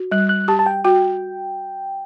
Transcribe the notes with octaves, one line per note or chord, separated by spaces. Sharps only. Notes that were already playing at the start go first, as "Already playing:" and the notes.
Already playing: F#4
G3 F#6
F#6
G4 A5
A5
G5
F#4 G5